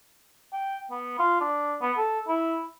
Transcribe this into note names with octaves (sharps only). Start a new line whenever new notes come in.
G5
B3
F4
D4
B3
A4
E4